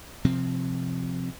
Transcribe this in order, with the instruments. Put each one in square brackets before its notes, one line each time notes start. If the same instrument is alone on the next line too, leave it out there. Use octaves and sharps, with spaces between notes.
[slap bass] C3 F3 C4